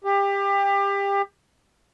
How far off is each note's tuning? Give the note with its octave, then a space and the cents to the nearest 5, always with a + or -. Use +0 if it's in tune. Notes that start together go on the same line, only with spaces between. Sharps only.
G4 +25